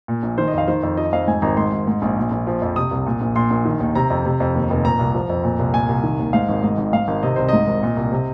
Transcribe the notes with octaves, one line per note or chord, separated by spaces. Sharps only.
A#2
A#1
D#3 C5
D#5
F2 F5
D#3 C5
F2
F3 D#5
F2 F5
G#2 G#5
G#1 A#5
G#2 C6
G#1
G#2
A#1
A#2
A#1
F3
F2
C3 D#6
C2
A#2
A#1
A#2 C6
A#1
D#3
D#2
C3 A#5
F2
C3
F2
D#2
F1
A#2 A#5
C2
F3
F2
A#2
C2
A#2 G#5
C2
D#3
D#2
G#2 F5
G#1
G#2 D#5
G#1
G#2 F5
G#1
C3 D#5
C2 C5
G#2 D#5
G#1
A#2
C2
C3